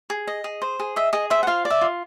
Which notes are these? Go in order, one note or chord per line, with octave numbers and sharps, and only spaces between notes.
G#4
D#5
G#4
C5
G#4
D#5 E5
G#4 D#5
C5 E5
F#5
F4 F5
D5
E5
F4